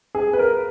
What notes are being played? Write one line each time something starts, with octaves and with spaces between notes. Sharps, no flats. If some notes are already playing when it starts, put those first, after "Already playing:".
G#4
B4
A#4